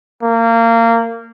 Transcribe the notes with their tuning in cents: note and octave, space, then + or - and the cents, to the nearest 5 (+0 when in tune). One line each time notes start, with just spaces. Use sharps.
A#3 -25